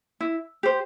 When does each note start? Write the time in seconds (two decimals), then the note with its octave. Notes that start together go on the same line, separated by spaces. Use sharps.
0.20 E4
0.63 G4 C5